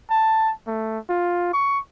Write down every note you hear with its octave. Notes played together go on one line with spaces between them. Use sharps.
A5
A3
F4
C#6